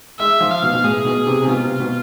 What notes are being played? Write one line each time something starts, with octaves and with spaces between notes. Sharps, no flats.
G#3 E5
F3
F5
B2
B2
A2 G#4
B2
C3
C3
B2 F4
C3
B2